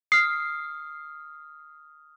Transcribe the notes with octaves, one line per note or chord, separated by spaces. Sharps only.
D#6 F6 C7